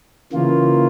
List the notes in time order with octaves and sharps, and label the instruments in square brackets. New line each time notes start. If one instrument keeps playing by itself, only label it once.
[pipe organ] C#3 E3 A#3 F4